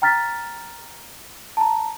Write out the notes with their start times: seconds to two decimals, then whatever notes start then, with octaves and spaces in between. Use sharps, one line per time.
0.02 G5 A#5 F6 A6 B6
1.57 A5 A#5